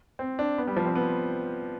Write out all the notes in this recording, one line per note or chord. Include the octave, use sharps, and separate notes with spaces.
C4
D4
B3
G3
F3
C4
B3